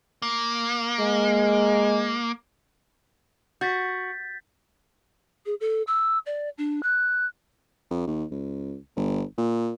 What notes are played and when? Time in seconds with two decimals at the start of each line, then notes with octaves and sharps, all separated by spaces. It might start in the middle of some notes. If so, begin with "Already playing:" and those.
0.22 A#3
1.00 G#3
3.61 F#4 G6 A6 B6
5.46 G#4
5.61 A4
5.87 E6
6.26 D5
6.58 D4
6.83 F#6
7.91 F2
8.07 D#2
8.31 C#2
8.96 G1
9.38 A#2